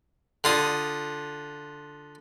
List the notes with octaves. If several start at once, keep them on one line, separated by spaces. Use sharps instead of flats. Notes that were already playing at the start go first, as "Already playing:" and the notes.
D3 F4 D#6